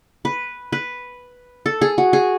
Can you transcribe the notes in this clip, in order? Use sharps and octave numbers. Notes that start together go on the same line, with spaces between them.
B4
B4
A4
G#4
F#4
G#4